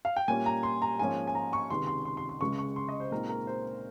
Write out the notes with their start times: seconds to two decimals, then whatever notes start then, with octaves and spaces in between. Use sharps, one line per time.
0.05 F5
0.16 G5
0.28 A#2 G3 A#3 C#4 G#5
0.46 A#5
0.63 C6
0.82 A#5
0.99 G#2 F3 A#3 C#4 G#5
1.27 G#5
1.35 A#5
1.53 C#6
1.70 C#2 C3 D#3 C6
1.87 C6
2.05 C6
2.17 C6
2.29 C6
2.41 C#2 C#3 G#3 C#6
2.58 C#6
2.76 C6
2.89 D#5
3.00 C5
3.12 A#2 G#3 C4 D#4 A#4
3.29 A#4
3.47 C5